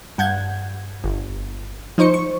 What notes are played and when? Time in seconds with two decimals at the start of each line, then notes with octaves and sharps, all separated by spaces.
0.18 G2 F#5 G6 G#6
1.04 G1
1.98 F3 D#4 C5 C#6 C#7
2.14 C#6